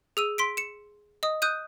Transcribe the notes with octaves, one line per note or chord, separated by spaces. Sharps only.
G#4 E6 D#7
C6 B6 D7
C#7 E7
D#5 D#6
D#6 F#6 G6 D#7